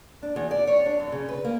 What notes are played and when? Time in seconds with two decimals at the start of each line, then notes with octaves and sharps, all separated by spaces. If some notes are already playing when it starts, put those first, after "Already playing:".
0.23 D4
0.36 E2
0.51 D5
0.67 C#5
0.86 D4
1.00 F#2
1.12 C#3
1.29 B4
1.45 A#3